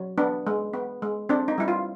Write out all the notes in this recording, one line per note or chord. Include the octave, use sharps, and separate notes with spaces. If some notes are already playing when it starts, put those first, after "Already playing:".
Already playing: F#3
B3 D4
G#3
B3
G#3
C4 D4
D#4
G3 E4
F4